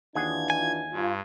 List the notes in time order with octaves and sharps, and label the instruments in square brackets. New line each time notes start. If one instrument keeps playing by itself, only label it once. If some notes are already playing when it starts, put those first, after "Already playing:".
[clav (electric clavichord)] D#2 G#4 F#5 [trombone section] E3 D4 F4 [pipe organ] G#6
[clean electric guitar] G#5
[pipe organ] G2 [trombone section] F4